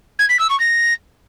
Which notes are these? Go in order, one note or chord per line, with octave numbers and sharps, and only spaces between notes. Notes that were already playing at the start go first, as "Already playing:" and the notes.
G#6
B6
E6
C#6
A#6